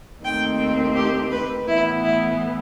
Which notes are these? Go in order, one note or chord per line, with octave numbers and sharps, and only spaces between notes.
D#2 D#3 A3 C4 G5
G4
B4
A2 E3 B3 E4
E4